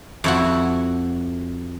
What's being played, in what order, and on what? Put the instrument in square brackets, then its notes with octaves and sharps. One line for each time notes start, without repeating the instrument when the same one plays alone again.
[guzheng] F2 E4 F#4